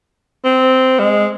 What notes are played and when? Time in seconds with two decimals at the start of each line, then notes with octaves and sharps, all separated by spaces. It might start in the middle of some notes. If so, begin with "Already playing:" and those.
0.45 C4
0.99 G#3